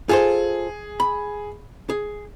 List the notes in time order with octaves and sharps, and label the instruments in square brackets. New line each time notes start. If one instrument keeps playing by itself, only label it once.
[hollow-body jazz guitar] F4 A4 C5 [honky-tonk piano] G#4
[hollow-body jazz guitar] B5
G#4